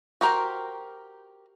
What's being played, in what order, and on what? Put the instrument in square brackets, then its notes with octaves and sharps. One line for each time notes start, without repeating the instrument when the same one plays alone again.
[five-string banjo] F#4 G4 A#4 C5 G5